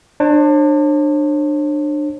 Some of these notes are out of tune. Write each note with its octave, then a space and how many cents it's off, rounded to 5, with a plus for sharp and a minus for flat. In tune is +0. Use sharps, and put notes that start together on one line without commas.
D4 +25 C#5 -45